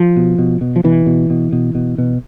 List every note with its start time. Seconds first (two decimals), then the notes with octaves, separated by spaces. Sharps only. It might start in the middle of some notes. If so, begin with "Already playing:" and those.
Already playing: F3
0.16 B2
0.39 B2
0.61 B2
0.76 F3
0.84 B2 E3
1.06 B2
1.30 B2
1.52 B2
1.75 B2
1.98 B2